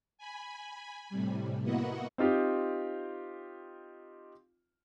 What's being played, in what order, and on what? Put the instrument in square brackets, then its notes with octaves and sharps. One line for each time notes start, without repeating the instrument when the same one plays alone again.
[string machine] G#5 B5
A2 C3 G3
A#3 B3 E4 F#4 D#5 F#5
[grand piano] C4 D#4 F4 G4